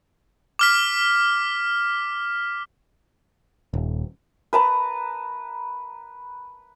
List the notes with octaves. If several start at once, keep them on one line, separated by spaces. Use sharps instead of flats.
D6 F6 B6
D#1
B4 A5 A#5